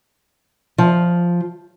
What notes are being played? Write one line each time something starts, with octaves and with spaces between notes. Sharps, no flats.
F3